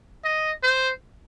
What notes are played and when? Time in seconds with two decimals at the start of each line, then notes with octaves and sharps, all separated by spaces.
0.25 D#5
0.63 C5